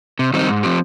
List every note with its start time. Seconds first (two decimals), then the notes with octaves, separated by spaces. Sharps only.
0.19 C3
0.33 D#3 G3 C4 D#4
0.49 G#2
0.63 F3 C4 G4